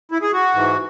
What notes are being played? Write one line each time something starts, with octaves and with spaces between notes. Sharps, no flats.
E4
G#4
F#4
G#2 E3